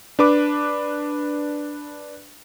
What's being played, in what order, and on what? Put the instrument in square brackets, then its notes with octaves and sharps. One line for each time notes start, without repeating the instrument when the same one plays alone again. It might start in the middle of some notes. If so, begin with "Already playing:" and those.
[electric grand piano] D4 B4 D6